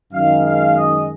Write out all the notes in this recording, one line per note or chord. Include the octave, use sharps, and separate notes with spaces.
F#2 D#3 G#3 F5
F5
D#5